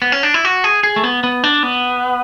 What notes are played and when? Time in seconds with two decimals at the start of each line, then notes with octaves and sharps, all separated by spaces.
0.02 B3
0.12 C#4
0.23 D4
0.34 E4
0.45 F#4
0.64 G#4
0.83 G#4
0.96 A3
1.03 B3
1.24 B3
1.44 D4
1.63 B3